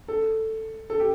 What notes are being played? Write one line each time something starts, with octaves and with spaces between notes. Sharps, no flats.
A4
A4
G4